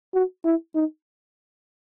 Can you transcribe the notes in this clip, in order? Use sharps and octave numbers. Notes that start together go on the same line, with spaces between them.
F#4
E4
D#4